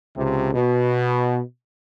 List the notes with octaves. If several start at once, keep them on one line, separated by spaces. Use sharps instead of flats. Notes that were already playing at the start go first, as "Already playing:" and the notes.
C#2 C3
B2